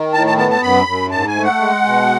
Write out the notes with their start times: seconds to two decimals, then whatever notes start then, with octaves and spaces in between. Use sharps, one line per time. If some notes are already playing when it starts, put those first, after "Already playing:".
Already playing: D#3
0.13 A2 A5
0.27 A5
0.38 B3 A5
0.50 A5
0.63 F#2 B5
0.87 F#2
1.11 G#2 A5
1.28 G#5
1.36 A3
1.43 F#5
1.60 G#3
1.85 B2